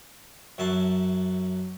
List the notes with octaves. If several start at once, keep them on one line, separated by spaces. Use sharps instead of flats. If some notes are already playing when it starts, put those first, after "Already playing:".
F#2 F#3 E5 A5 C6